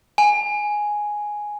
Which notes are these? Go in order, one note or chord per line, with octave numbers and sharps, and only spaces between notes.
G#5